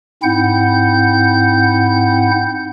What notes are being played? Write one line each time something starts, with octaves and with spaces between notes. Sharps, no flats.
G#2 C4 E4 F#5 G6